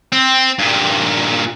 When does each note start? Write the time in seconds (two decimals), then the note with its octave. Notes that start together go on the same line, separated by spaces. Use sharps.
0.12 C4
0.59 G2 A#2